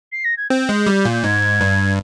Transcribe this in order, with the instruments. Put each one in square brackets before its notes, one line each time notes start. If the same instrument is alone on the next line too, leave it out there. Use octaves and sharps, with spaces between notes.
[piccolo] C7
A#6
G#6
[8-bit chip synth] C4 [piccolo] G6
[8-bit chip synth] G#3
G3
A#2
[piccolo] G6
[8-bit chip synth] G#2 [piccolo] G#6
[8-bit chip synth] G2